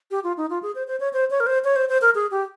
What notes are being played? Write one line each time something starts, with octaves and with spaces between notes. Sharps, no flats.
G4
F4
D#4
F4
G#4
C5
C5
C#5
C5
C#5
A#4
C5
C#5
C5
C5
A#4
G#4
G4